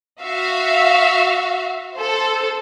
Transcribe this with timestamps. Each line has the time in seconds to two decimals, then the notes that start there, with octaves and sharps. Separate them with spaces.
0.22 F#4 E5 F5
1.95 A4 C5